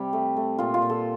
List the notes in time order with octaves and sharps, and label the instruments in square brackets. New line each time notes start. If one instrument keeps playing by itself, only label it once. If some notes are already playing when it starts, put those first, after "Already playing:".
Already playing: [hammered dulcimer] C3 G3 G4
A3
A3
A#2 F4
F4
A#2
A4